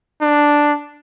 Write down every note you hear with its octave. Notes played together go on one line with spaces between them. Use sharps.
D4